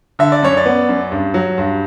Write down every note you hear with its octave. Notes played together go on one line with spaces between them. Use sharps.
D3 E5
D5
F#2 C#5
D5
B3
F#2
G2
F#3
G2